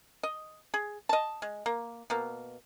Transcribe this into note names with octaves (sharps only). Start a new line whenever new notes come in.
D#5
G#4
D#5 A5
G#3
A#3
B2 A#3